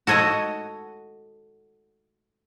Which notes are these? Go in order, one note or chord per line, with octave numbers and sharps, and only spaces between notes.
F#4 A4 C#5 D#5 F#5